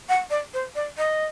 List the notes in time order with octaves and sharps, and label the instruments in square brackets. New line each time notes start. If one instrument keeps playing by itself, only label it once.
[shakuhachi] F#5
D5
C5
D5
D#5